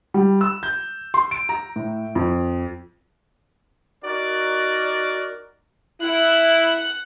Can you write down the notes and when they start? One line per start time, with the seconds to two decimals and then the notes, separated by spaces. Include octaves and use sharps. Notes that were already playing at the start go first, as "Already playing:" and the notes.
0.14 G3
0.41 E6
0.63 G6
1.14 C6
1.31 D7
1.49 A#5
1.76 A2
2.15 F2
4.04 D#4 F#4 A#4 D5
6.01 E4 F#5 F#6